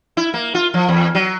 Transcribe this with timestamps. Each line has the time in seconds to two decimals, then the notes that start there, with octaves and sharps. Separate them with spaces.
0.17 E4
0.34 A#3
0.55 F4
0.74 F3
0.89 E2
1.15 F#3